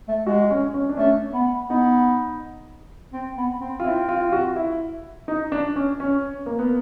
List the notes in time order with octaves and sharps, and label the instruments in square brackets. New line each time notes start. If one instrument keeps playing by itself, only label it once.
[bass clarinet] A3
[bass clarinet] G#3 [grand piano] F#4
[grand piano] C#4
C#4
D4
[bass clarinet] A3 [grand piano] C#4
[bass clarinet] B3
[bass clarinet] B3 [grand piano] D#4
[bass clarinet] C4
B3
C4
[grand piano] F4
[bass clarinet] C4 [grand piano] E4
[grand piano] F4
F4
F#4
E4
D#4
D4
C#4
C#4
A#3
B3